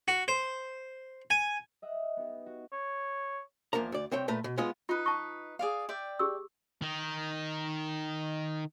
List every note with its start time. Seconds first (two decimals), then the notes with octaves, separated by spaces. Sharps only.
0.08 F#4
0.28 C5
1.30 G#5
1.82 D#5 E5 F#5
2.17 B3 D#4 G4
2.46 F#4
2.72 C#5
3.73 E2 F3 A#3 A#4 A#5
3.92 D2 D5
4.11 C2 C4 C#5 G5
4.28 A#2 A3 B4 A#5
4.44 B2
4.58 G#3 B3 F4 D#5
4.89 D#4 F4 B4
5.06 A5 C#6
5.59 G#4 D5 F5
5.89 D5 E5 G5
6.19 G4 G#4 E6
6.82 D#3 D#4